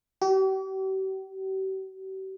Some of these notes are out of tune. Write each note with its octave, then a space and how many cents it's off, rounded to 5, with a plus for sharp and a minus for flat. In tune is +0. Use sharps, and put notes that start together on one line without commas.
G4 -45